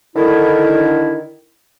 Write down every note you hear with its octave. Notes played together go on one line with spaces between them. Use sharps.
D3 D#3 E4